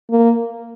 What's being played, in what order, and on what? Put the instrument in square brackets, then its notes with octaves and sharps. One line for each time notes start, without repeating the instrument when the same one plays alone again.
[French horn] A#3